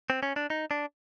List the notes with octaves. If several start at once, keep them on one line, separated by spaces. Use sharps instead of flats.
C4
C#4
D4
D#4
D4